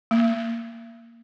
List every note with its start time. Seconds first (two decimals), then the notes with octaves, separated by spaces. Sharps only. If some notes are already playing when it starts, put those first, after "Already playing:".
0.11 A#3